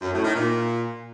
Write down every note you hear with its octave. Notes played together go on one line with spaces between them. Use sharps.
F#2
A2
D#3
A#2